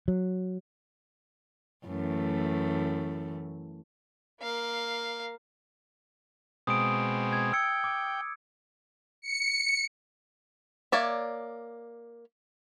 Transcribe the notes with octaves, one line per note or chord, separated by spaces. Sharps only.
F#3
F#2 E3 A3
A#3 F5
B2 G#3 C4 D#6 D7
G#6
G5 E6 G#6 C#7
D6
C#7
A#3 C#5 D5 E5